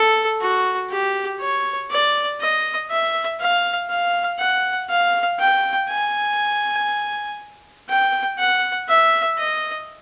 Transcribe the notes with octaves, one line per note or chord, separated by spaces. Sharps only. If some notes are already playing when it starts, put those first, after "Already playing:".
Already playing: A4
F#4
G4
C#5
D5
D#5
E5
F5
F5
F#5
F5
G5
G#5
G5
F#5
E5
D#5